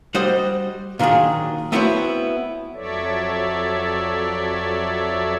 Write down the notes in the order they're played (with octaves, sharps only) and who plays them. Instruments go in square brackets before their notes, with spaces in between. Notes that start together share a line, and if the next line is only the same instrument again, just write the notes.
[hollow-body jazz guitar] G3 F#4 C5 D#5
A#2 D#3 F#3 D4 G#4
A3 B3 C4 E4 F#4 C#5
[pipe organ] F2 F#3 A4 C#5 D5 E5